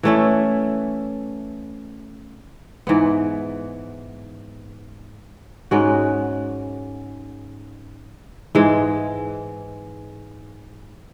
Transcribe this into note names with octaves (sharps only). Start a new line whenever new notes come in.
E3 A3 C#4 E4
G#2 E3 B3
G#2 G#3 C#4 F#4
G#2 E3 G#3